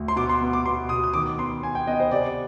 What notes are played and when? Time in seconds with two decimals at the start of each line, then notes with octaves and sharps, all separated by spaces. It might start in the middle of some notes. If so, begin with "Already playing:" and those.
Already playing: D2
0.08 C6
0.16 B2 D6
0.29 C6
0.41 B3
0.53 D6
0.66 B2 C6
0.89 B2 D#6
1.04 D#6
1.14 D#3 D6
1.38 B3 C6
1.63 B3 G#5
1.75 G5
1.87 B3 D#5
2.00 C5
2.11 C3 D5